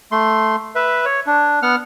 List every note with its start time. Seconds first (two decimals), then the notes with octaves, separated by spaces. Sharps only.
0.12 A3 C6
0.75 B4 E5
1.05 C#5
1.27 D4
1.63 B3 F#5 F6